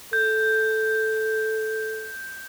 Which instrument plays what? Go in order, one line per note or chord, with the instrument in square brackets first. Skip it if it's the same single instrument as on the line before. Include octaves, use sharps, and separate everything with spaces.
[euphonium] A4 [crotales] G6